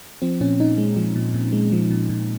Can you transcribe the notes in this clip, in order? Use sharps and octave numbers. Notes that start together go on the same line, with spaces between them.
F3 C4
A#2 C#4
A#2 D#4
G#3
F3
A#2
A#2
G#3
F3
A#2
A#2